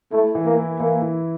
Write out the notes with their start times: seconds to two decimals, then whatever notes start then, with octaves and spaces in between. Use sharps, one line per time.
0.12 A3 E4
0.35 E3
0.46 A#3
0.57 E4
0.80 E3 A#3
1.02 E3